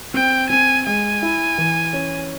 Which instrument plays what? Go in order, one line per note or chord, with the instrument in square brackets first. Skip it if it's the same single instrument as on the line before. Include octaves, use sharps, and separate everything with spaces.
[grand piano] C4 [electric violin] G5
[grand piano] C4 [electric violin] G#5
[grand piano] G#3 [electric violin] G#5
[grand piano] E4
E3
C#4